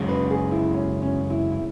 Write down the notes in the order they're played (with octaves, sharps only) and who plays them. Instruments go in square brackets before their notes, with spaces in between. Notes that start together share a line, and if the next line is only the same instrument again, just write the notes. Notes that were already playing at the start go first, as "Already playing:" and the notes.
Already playing: [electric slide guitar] F#2 C#3 G#3
[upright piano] B4
G#4
E4
C#4
C#4
E4
E4